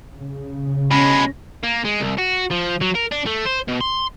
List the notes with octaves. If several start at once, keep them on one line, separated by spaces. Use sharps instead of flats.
C#3
B2 G#3 C#4 B5
A#3
G#3
C2
F#4
F3
F#3
A#4
D4
A3
C5
B2
C6